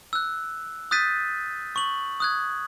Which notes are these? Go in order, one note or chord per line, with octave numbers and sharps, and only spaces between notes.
E6 F#6
D#6 F#6 G6 A6 B6 D#7
C#6 F#7
D#6 F#6 G#6